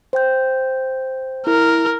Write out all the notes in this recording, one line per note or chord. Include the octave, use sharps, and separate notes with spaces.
C5 G5 G6
E4 A#4